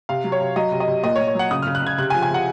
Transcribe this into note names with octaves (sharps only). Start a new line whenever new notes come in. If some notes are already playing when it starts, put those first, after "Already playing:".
C3 F5
F#3
C#5
C3
F#3 D#5
C3
D#5
C3
A#2 D#5
C#5
A#2
C#5
F#3 F#5
C#3 D#6
F6
C#3
F#6
C#3 G#6
C3 F#6
G#5
F3
G#5
C3 F#5